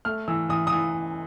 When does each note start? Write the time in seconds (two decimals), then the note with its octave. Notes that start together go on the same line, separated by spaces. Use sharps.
0.05 A3 F6
0.28 E3 E6
0.49 E3 D#6
0.67 D#6
0.72 E3